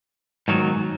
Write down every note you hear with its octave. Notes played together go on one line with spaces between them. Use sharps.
G#2 D#3 F#3 B3